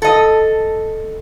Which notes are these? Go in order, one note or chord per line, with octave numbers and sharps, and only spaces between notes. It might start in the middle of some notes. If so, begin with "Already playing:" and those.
A4 D#5